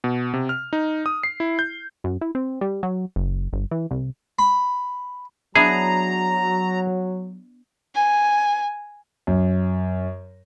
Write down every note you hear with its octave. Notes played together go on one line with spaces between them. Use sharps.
B2
C3
F6
D#4
D#6
C7
E4
G6
F#2
E4
C4
G3
F#3
F#1
G1
E3
C2
B5
F#3 B3 D4 E4 G#4 A#5
G#5
F#2